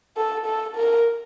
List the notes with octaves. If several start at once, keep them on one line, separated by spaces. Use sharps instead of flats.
A4
A4
A#4